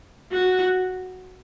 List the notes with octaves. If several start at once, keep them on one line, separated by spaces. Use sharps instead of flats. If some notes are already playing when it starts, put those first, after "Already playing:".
F#4